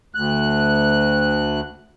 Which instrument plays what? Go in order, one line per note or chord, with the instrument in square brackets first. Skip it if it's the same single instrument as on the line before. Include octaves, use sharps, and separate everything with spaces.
[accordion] D2 F#6